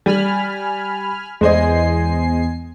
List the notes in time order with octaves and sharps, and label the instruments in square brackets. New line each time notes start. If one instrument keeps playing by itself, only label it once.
[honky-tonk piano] G3 [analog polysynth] G#5 B5 F6
[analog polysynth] E2 G#5 C7 [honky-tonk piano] G#3 C5 D#5